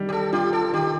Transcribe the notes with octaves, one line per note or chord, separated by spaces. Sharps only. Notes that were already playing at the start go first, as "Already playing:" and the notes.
Already playing: D#3 G3
G4
A4
F4 G4
A4
D#3 G4